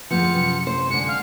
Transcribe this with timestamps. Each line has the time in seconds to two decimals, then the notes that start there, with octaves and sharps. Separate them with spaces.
0.11 F2 D3 F3 G#3 B3 C#7
0.34 F#2 C3 A5
0.67 C5
0.90 D3 G#3 C#7
1.08 F5